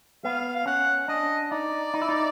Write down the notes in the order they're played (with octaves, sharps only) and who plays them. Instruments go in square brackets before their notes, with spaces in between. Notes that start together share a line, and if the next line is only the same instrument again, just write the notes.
[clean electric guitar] B3 [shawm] F5
[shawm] F5
[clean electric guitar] C#4 [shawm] F#5
[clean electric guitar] D4 [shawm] D#5
[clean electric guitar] D#4 [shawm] D5
[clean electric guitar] D#4
E4
D#4